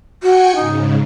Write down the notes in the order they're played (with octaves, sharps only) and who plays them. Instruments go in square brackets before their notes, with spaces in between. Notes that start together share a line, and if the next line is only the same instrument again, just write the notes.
[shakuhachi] F#4 [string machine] G5 G#5 C#7
[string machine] G#2 C#3 [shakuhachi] D#4